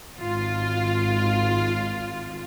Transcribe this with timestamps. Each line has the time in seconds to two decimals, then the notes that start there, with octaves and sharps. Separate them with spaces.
0.19 G#1 F4